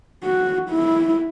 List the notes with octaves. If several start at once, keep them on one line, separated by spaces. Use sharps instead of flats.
F#4
E4